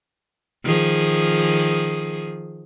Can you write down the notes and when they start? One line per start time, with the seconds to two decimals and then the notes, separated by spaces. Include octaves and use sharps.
0.64 D#3 F3 G#4